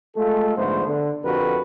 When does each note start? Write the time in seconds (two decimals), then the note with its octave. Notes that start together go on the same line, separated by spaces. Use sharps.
0.17 G#3 A3 F4 A4
0.57 F2 G#2 D3 A3 B3 C5
0.86 D3
1.24 F2 D3 F#4 G4 A#4 B4